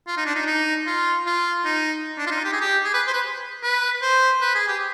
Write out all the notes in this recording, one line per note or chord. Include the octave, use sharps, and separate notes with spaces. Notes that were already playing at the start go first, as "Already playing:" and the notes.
F4
D#4
D4
D#4
D#4
F4
F4
D#4
D4
F4
D#4
G4
G#4
G4
G#4
B4
C5
B4
B4
C5
B4
G#4
G4